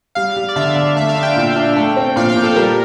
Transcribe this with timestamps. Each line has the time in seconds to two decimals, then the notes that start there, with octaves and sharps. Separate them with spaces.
0.15 G3 F5
0.36 G3
0.49 D5
0.56 D3 E5
0.75 D3
0.96 A3 E5
1.09 F5
1.16 D4
1.23 G5
1.36 A#2
1.56 D4
1.76 A3
1.96 C4
2.16 A#2 F5
2.29 G5
2.36 A#2
2.43 A4
2.56 G3 A#4